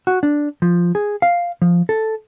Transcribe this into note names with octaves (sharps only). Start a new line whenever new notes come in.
F#4
D4
F3
G#4
F5
F3
A4